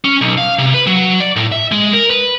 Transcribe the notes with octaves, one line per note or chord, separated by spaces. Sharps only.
C#4
B1
F5
C3
B4
F#3
D5
A2
E5
G#3
A#4
B4